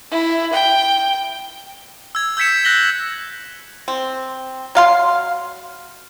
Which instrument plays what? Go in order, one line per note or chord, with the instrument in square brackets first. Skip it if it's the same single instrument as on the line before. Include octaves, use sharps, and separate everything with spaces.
[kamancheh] E4
G5
[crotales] E6 G#6
E6 G6 G#6 B6 C#7 E7
F#6 G6 A#6 B6 F#7 G7
[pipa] C4
F#3 F5 C6